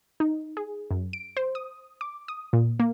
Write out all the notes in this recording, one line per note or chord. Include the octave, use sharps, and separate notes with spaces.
D#4
G#4
F#2
D7
C5
D#6
D6
D#6
A#2
A#3